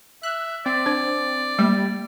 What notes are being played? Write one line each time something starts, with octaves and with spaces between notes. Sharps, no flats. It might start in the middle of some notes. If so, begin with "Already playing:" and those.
E5 F#6
C4 D5
D4 C5
G3 A3 A#3